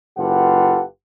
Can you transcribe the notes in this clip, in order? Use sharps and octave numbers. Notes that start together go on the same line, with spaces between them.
F#1 F4 G4 A4 B4 F#5